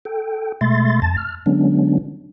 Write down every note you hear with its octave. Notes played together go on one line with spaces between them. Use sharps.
A4 G5
B2 G#3 A3 E5 C6 A6
F2 A5 A6
F6
D3 F#3 G#3 B3 C#4 D4